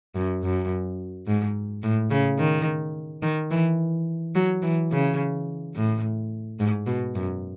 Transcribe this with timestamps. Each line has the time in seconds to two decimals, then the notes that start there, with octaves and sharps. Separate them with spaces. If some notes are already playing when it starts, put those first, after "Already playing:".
0.15 F#2
0.43 F#2
1.27 G#2
1.83 A2
2.10 C#3
2.38 D#3
3.22 D#3
3.51 E3
4.35 F#3
4.62 E3
4.91 C#3
5.75 A2
6.60 G#2
6.87 B2
7.15 F#2